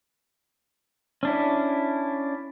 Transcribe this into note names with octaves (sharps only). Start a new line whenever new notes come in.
C#4 D4 E4